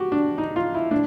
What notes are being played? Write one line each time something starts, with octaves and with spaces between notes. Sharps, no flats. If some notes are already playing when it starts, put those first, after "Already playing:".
Already playing: F#4 G4
D4
D#4
F4
E4
A2 D4